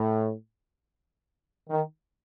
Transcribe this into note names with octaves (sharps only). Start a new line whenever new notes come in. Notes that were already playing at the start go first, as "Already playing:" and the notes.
Already playing: A2
D#3